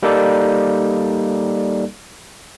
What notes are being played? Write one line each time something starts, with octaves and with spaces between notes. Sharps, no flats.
G3 A#3 D#4 A4 D5